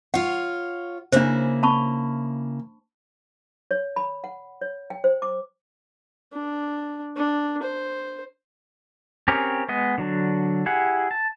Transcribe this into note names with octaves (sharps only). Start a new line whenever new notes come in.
F4 C#5 F#5
C#3 A#3 D4 E4 C5
A5 B5 C#6
C#5
B5
F#5
C#5
G5
C5
D6
D4
D4
C5
C4 C#4 G4 G#4 A#4
G#3 B3 D#5
D3 F#3 D4
E4 G4 G#4 F#5
A5